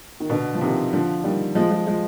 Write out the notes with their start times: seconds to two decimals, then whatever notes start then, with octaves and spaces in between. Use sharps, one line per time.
0.20 D#3
0.29 B2 D3
0.54 F3
0.61 C3 D#3
0.93 D3 F3
1.24 D#3 G3
1.55 F3 G#3
1.71 F3 G#3
1.87 F3 G#3